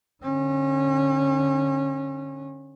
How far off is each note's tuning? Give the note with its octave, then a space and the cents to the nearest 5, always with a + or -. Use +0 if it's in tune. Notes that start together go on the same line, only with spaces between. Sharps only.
D3 +5 C#4 -30